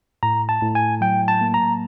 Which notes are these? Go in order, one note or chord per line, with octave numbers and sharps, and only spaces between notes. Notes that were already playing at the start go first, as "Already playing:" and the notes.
A2 A#5
A5
A2
G#5
F#3 G5
A5
A#3
A#5